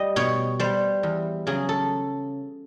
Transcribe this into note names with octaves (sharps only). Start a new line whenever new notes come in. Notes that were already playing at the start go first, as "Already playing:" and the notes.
Already playing: G3 D#5
B2 C#5
G3 C5
E2
C#3 F#3 G#4
A4